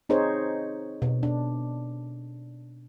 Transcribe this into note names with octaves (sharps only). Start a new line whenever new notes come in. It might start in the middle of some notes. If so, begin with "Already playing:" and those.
C4 D#4 G#4 C5 C#5
B2
D4